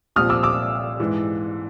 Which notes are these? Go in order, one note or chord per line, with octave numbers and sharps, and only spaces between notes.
C2 A#2 F3 D#6 F6
D6 E6
D6 E6
G#2 E3